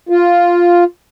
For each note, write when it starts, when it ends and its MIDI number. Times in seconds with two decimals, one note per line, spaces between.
0.09 0.84 65